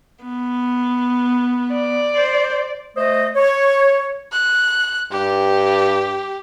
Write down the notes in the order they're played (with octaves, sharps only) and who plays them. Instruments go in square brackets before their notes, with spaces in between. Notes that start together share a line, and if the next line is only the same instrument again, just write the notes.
[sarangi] B3
[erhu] D5
[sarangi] C5
[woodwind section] A3 C5 D#5
C#5
[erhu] F#6
[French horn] G2 [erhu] G4